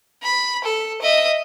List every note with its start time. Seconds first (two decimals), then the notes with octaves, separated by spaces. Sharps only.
0.23 B5
0.64 A4
1.01 D#5 E5